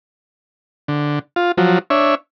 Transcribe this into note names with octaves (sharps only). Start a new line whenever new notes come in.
D3
F4
F3 F#3
D4 C#5 E5